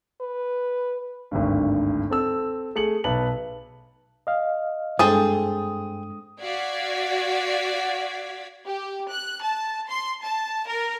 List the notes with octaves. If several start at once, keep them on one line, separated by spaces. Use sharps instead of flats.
B4
G#1 D2 G2
C4 A4 E6
A3 G#4 C#7 F#7
B1 B4 A5 F#7
D#5 F5
G2 G#3 C4 D4 G#4 A4 A5 D#6
F#4 D5 F5 G#6 B6
G4
F#6
A5
C6
A5
A#4